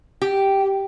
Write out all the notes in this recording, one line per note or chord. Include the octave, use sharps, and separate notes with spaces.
G4